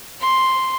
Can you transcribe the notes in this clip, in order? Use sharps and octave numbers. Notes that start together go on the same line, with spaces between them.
C6